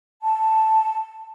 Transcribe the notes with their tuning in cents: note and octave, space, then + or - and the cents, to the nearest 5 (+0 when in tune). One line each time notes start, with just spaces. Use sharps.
A5 +0